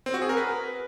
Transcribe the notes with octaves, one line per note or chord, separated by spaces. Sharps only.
C4
F#4
G#4
A#4
B4